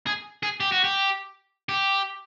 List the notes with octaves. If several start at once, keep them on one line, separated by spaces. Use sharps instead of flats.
G#4
G#4
G4
F#4
G4
G4